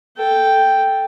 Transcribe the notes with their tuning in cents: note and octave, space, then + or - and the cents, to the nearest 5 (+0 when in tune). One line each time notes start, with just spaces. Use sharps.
A4 +0 G5 +0